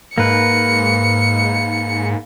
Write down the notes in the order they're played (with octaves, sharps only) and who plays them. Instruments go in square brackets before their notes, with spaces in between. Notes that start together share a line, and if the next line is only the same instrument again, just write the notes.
[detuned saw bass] G#2 [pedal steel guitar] A#3 B4 [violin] C#7